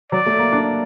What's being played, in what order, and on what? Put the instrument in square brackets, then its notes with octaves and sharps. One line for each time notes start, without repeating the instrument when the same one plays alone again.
[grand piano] F#3 [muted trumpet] D5
[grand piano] A3
A#3
D4